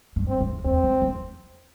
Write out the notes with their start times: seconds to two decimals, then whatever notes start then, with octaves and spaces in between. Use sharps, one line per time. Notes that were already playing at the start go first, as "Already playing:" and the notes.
0.16 G2
0.28 C4
0.40 E2
0.65 E2 C4
0.84 E2
1.02 E2